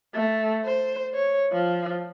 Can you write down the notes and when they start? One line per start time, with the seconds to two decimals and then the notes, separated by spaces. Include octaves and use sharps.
0.14 A3
0.65 C5
1.14 C#5
1.52 F3